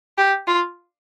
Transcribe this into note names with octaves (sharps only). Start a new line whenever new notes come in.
G4
F4